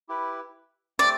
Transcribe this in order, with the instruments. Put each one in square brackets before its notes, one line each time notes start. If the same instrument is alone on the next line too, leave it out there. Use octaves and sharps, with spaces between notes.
[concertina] E4 G4 B4
[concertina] A3 C4 G4 [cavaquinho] D5